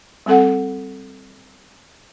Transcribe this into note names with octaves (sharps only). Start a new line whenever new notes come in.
G3 C4 A4 F#5